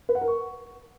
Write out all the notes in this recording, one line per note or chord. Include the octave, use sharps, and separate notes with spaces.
B4
F#5
A#4
C#6